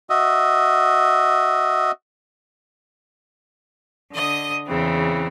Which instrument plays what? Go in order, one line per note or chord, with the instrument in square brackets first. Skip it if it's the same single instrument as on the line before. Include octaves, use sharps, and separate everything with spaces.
[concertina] F#4 D#5 E5
[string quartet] D3 D#5 D#6
E2 C#3 E3 C4